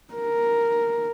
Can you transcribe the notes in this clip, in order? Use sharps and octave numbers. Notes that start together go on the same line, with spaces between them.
A#4